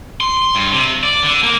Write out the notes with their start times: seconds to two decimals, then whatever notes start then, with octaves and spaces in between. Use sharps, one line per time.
0.20 C6
0.55 G2
0.72 C3
1.03 D5
1.23 D3
1.43 A#3